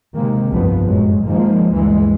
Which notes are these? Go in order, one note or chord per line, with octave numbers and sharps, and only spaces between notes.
C3 D#3 G#3 A#3
F1 C2 G2 F3 B3
F#2 A2 F#3 G#3
D#3 F3 G#3 A#3
D2 G2 E3 G#3